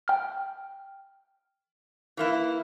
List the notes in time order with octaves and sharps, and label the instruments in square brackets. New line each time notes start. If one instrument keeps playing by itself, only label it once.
[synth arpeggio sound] G5 F6
[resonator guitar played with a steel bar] E3 A#3 E4